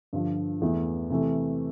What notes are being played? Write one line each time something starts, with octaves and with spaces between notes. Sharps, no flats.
G2 D3 F3
E2 E3 A3 E4
C3 E3 A3